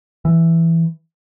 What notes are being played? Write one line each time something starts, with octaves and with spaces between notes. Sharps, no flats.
E3